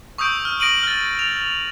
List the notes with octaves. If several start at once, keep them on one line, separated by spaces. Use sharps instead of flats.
C#6 D#6 E6 G6 D7
F6
D#6 A#6 D7 D#7 F#7
F6 A6
F7
D7